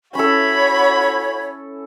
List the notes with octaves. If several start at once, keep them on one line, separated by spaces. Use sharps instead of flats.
C#4 E4 F#4 A4 C#5 B5